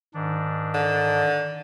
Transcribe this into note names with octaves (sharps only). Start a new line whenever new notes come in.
G#2 D#3 D4
D3